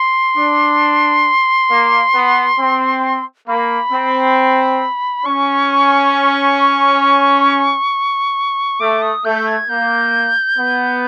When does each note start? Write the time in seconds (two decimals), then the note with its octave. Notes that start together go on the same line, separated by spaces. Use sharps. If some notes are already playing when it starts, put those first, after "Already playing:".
Already playing: C6
0.37 D4
1.70 A#3
2.14 B3
2.59 C4
3.48 A#3 B5
3.92 C4
5.25 C#4 C#6
8.80 A3 D6
9.02 D#6
9.25 A3 G6
9.47 G#6
9.69 A#3 G6
10.58 B3